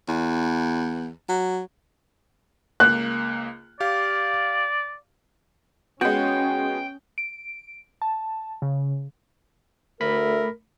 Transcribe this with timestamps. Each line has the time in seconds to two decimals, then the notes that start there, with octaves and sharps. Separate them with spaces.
0.08 E2
1.29 F#3
2.80 C#2 A#3 F#6
3.80 G4 D5 F5
6.01 G#3 B3 C#4 F#4 G5
7.18 D7
8.02 A5
8.62 C#3
10.01 D2 A3 A#4 E5 B5 B6